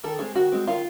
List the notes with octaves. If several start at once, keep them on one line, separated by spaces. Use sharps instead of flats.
D#3 A4
G#3 C4 G#4
D#3 F#4
G#3 C4
D#3 F4